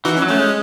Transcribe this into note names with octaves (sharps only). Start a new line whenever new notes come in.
E3 D#4 F#4
C#4
F#3
A3 C#4
G#3